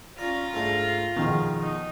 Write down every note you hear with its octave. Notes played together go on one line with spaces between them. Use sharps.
C#4 F4 D5 A#5
G#2 A3 D4
F2 B2 D#3 G#3
D#4